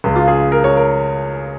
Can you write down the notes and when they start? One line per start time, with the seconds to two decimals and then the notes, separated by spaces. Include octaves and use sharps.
0.04 C#2 C#3 G#3
0.16 F4
0.28 G#4
0.52 A#4
0.64 C#5
0.77 A#4